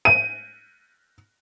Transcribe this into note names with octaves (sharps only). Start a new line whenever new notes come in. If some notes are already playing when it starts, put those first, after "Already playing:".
D#7